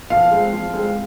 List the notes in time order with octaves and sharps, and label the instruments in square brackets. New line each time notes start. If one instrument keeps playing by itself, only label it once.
[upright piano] F3 F5
G#3 C4
F3
G#3 C4